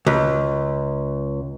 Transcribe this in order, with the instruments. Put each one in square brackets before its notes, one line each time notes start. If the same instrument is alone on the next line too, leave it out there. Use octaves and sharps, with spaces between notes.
[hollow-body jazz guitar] C#2